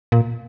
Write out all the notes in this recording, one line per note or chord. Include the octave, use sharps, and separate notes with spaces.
A#2